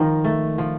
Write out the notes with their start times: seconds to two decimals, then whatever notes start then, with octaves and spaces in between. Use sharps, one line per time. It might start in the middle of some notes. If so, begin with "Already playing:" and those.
Already playing: D#3 F3 D#4
0.24 A3
0.58 F3